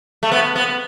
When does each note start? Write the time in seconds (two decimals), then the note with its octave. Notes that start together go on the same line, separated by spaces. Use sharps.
0.23 A3
0.32 B3
0.56 B3